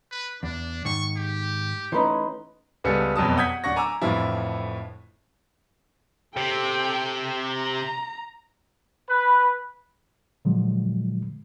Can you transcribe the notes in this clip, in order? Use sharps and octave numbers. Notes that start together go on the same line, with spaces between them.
B4
E2 D4
G#2 D#3 C#6
G4
E3 A3 C#4 D#4 B4 C6
C#2 G3 B3 A4 G#5 C#7
E1 F2 B2 F#3 A5 D#6
F#5 D#6 G6 G#6 B6
D1 D4 F#5 C#6 A#6
G#5 A#5 D6 E6
F2 A2 D3 E3 F3 E4
C3 A4 G5
A#5
B4
A#2 D3 F3 F#3 G#3